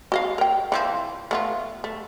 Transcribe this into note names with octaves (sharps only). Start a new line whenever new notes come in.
F#4 D#5 F5
A#4 G5
E3 F3 C4
A3 B3 F4
A3